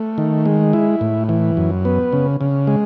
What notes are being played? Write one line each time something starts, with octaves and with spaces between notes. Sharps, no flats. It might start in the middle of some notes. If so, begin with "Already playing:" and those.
Already playing: A3
D#3
G#3
E4
A2
E3
F#2
B3
C#3
C#3
G#3